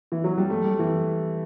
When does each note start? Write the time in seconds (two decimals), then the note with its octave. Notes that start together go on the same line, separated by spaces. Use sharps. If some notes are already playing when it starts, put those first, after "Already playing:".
0.12 E3
0.24 F#3
0.38 G3
0.50 A3
0.64 G3
0.79 E3